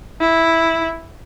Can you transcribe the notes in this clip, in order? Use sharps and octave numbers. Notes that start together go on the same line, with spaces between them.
E4